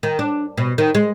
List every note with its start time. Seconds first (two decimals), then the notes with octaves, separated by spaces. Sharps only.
0.03 D#3
0.19 D4
0.58 B2
0.78 D#3
0.95 G#3